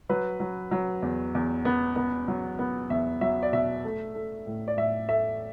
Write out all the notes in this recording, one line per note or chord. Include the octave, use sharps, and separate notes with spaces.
F#3 B4
F#3
F#3
E2
E2
B3
B3
F#3
B3
E2 E5
F#3 E5
D5
B2 E5
A3
A3
A2
D5
A2 E5
A3 E5